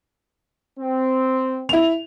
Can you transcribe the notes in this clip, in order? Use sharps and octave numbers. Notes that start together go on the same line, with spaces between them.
C4
E4 F7